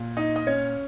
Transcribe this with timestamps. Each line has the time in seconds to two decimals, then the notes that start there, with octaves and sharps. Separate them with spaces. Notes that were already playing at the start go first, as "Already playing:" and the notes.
Already playing: A#2
0.17 D#4 D#5
0.36 D#5
0.47 C#4 C#5